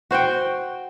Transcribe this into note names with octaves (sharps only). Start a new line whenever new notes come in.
F#4 C5 F#5 G5